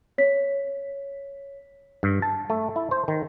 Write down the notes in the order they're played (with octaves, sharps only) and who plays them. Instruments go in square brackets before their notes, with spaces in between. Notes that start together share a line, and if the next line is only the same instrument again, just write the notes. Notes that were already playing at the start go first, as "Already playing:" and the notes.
[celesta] C#5 B6
[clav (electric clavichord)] G2
A5
A3
E4
C5
D#3